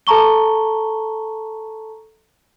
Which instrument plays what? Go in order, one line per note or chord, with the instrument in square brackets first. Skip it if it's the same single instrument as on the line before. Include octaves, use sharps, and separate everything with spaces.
[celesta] A4 A5 A#5 C#6 G7